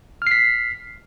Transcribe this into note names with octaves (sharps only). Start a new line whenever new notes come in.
F6 B6 C7